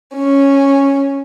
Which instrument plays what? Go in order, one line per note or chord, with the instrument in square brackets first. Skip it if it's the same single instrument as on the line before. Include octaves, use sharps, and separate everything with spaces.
[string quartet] C#4